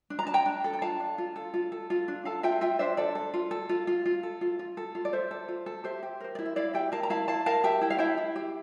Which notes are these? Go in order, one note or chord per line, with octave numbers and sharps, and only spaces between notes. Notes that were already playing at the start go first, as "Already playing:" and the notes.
D4
A#5
D4 A5
G5 A#5
D4
A4
G5
F4 F5 A5
D4
F4
A4
F4
A4
F4
D4
A4 F5 A5
F4 E5 G5
F4 E5 G5
D4 C5 E5
A4 D5
A4
F4
A4
F4
F4
F4
A4
F4
F4
A4
F4
D5
A4 C5 E5
A4
F4
A4
G4 C5 E5
G4
A#4 C5
D5
E4
E5
E4 D5 F5
G4 E5 G5
A#4 F5 A5
A#5
E4 F5 A5
E4 F5 A5
A#4 F5 A5
G4 E5 G5
E4 G5
F5
E4 E5 G5
E4
G4